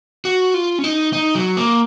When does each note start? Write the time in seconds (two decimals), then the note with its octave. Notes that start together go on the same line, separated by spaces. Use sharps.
0.25 F#4
0.54 F4
0.78 C#4
0.84 D#4
1.13 D#4
1.35 F#3
1.57 A#3